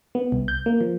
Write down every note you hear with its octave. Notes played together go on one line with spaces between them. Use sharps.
B3
C2
G6
A#3
F3